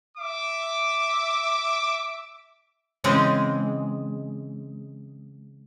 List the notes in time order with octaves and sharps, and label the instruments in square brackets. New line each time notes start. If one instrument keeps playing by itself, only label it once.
[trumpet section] E5 D6
[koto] C#3 E3 G#3 C4